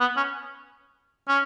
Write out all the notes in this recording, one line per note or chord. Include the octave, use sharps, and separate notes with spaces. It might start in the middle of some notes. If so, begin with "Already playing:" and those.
B3
C#4
C#4